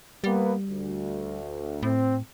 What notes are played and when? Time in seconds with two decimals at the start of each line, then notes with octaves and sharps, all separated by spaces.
0.24 G3 A#3 B3
0.67 D2
1.83 A2 C4